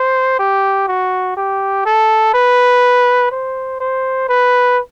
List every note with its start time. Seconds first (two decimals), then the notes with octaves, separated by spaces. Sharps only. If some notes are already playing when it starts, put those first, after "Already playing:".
Already playing: C5
0.39 G4
0.88 F#4
1.37 G4
1.85 A4
2.34 B4
3.32 C5
3.80 C5
4.29 B4